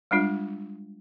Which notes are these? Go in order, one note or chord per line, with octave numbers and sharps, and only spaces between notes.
G3 G#3 D4 F4